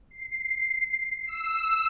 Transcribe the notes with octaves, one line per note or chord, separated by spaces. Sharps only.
C7
E6